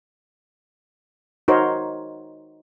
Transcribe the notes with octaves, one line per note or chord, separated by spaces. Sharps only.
D#4 F#4 A#4 C5 C#5